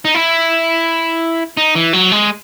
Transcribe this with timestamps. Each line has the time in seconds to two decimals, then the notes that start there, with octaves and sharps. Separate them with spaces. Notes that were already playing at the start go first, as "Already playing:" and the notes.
0.05 D#4
0.15 E4
1.57 D#4
1.75 E3
1.93 F#3
2.11 G#3